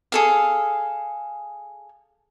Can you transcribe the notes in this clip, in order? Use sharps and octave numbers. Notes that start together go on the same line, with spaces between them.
G#4 A4 F5